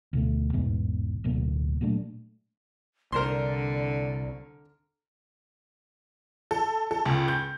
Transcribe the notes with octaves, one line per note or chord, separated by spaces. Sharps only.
D2 B2 A3
A1 E2 G#2 B2
D1 D2 B2 A#3
A#2 F#3 A3 D4
C2 D3 A#4 C5 D5 C6
A4
A4
C#2
G6